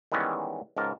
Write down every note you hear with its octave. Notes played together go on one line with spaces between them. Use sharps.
D#3 E3 G3 G#3 B3 C#4
C#2 G#2 A#4 A5